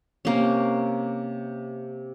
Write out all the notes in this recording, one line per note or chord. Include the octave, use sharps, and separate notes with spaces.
C3 A#3 C#4